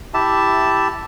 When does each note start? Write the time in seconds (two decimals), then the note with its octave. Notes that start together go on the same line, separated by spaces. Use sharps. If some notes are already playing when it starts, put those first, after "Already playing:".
0.14 E4 G4 E5 A5